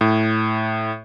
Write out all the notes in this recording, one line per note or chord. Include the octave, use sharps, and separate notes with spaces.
A2